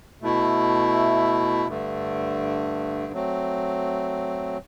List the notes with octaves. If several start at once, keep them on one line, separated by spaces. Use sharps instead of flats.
B2 A3 E4
G2 D3 A3
F#3 A3 C4